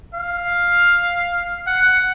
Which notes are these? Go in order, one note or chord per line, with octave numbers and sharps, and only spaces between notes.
F5
F#5